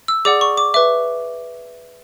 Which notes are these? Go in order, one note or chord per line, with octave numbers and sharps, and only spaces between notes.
E6
G#4 D5 F#5 D6
C#6
D6
B4 E5 D6